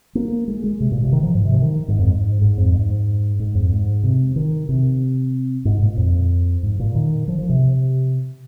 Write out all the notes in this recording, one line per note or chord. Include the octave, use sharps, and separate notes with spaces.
A#3
G#3
G#3
C3
A#2
C3
D#3
F3
G#2
C3
F3
D#3
G#2
F2
G#2
G#2
F2
G#2
G#2
F2
G#2
C3
D#3
C3
G#2
A#2
F2
G#2
A#2
D#3
F3
F3
C3